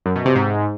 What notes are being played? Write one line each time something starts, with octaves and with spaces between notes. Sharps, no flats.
F#2
B2
C3
G#2